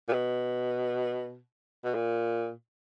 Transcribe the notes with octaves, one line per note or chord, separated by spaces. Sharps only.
A#2
B2
B2
A#2